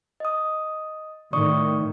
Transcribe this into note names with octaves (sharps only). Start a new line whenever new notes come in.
D#5 D#6
A2 D#3 D5 C#6 D#6